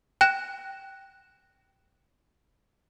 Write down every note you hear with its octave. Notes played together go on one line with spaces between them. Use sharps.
G5 F#6 A#6 E7